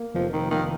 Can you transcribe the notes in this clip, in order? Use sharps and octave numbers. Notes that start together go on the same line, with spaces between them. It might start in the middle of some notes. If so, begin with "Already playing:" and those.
Already playing: A#3
F1 F3
D#3
D#3 F3